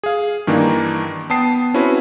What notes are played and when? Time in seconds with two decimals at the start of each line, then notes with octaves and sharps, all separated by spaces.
0.03 G#4 F5
0.47 G2 D#3 E3 A#3 D4
1.30 B3 G5 A5 D#6 C7
1.74 C4 C#4 E4 F#4 B4